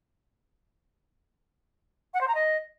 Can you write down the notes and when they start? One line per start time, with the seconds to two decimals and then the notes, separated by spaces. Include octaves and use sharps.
2.14 F#5
2.21 C5
2.28 A#5
2.35 D#5